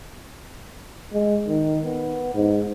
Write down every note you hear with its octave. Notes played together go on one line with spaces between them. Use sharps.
G#3
D#3
B3
G#2